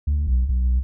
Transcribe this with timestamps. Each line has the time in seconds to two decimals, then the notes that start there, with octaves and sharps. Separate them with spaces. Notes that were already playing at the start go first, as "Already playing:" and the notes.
0.07 D2
0.27 B1
0.49 B1